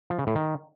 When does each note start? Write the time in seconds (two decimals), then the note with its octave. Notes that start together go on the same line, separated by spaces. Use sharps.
0.10 F3
0.19 C#3
0.27 A2
0.35 D#3